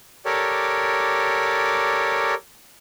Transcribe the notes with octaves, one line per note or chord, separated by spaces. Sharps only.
G4 A4 A#4 C#5 D5